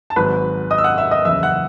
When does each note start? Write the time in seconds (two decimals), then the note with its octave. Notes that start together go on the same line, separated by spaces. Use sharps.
0.10 A5
0.16 G#1 G#2 F#3 B4 B5
0.71 D#5 D#6
0.78 E6
0.84 F#5 F#6
0.98 E5 E6
1.11 D#5 D#6
1.25 F#1 E2 C#3 E5 E6
1.43 F#5 F#6